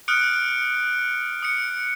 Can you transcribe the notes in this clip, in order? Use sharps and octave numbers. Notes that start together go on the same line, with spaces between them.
D#6 F6 F#6 C#7 D7
D#6 C#7